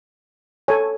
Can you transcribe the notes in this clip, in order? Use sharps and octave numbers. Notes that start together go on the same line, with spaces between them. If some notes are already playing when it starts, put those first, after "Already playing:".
A4 C#5 G#5